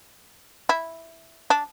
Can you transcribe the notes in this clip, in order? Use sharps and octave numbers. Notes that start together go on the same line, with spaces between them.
E4
D4